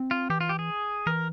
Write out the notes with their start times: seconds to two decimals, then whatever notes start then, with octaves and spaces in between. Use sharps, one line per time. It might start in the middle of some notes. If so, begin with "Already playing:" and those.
Already playing: C4
0.11 F4
0.30 E3 G4
0.41 F4
0.49 G4
0.59 G#4
1.07 E3 A#4